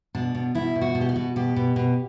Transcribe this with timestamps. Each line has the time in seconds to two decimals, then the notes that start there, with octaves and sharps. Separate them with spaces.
0.15 B2 D4
0.35 B2
0.55 B2 E4
0.75 B2
0.81 F#4
0.95 B2
1.01 G4
1.09 F#4
1.16 B2
1.36 B2 G4
1.56 B2
1.76 B2